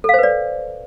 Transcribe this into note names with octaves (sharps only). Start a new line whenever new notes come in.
A4 B4 C5 D5 F5